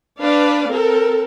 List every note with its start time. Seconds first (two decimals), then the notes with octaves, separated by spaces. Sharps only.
0.20 D4 B4 D5 F5
0.69 C4 A4 A#4